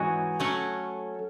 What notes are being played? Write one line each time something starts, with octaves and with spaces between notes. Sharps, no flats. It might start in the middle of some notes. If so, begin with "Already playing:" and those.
Already playing: G#2 E3 G#3 C#4 F#4
F#3 A3 C#4